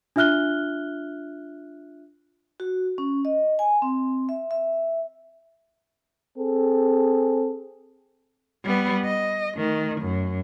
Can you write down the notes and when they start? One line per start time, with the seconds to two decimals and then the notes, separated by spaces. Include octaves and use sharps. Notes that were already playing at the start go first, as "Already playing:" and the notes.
0.16 D4 F4 E5 F6 F#6 G7
2.60 F#4
2.98 C#4
3.25 D#5
3.59 G#5
3.82 C4
4.29 E5
4.51 E5
6.38 C4 G#4 A4
8.64 G3 B3
9.05 D#5
9.57 D#3 A3
10.01 F#2